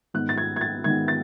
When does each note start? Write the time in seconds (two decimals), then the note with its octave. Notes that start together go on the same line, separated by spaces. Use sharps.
0.14 G#2 D#3 G#3 B3 F#6
0.29 A6
0.38 G#6
0.56 G#6
0.61 A6
0.84 G#2 D#3 G#3 B3 G#6
1.08 A6